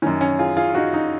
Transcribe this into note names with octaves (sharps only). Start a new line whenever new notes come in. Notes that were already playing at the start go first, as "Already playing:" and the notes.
F#2 D#3 C#4
C#4
F4 G#4
F4 G#4
D#4 F#4
D#4